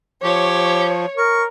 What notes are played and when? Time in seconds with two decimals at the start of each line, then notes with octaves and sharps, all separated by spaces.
0.23 F3 G4 C#5
1.17 A#4 C#6